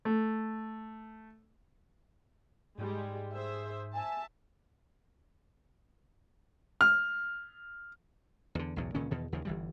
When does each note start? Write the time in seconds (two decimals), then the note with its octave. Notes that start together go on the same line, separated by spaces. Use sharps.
0.05 A3
2.78 G#2 G3 G#3
3.33 G#4 C5 E5
3.94 E5 G#5 A5
6.81 F6
8.55 E2 D3
8.76 B1 E2 A2
8.95 C#2 A#2 D#3 C#4
9.11 E2 B2 D#3
9.32 D#2 C#3 F3
9.45 G1 E3 G3